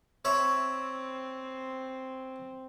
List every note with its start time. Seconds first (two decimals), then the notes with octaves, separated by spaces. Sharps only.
0.25 C4 C#5 E5 B5